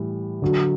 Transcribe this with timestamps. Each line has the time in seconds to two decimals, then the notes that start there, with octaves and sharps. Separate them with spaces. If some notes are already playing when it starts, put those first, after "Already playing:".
Already playing: A2 E3 G3
0.42 D3 F#3